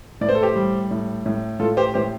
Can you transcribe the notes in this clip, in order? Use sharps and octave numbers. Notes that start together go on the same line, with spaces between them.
A2 D5
C5
A4
G4 C5
G3
A2
A2
A2 F4 A4
G4 C5
A2 G4 C5